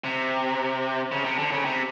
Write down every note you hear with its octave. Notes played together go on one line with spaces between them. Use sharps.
C3
C#3
C3
D3
C#3
C3